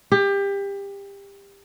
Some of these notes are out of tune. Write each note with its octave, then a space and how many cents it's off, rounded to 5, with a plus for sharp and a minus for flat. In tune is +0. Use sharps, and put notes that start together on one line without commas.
G4 +25